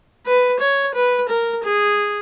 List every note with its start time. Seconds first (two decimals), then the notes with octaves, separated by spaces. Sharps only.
0.26 B4
0.60 C#5
0.95 B4
1.29 A#4
1.64 G#4